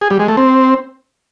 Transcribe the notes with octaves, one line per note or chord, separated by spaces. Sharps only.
G#4
G3
G#3
A3
C4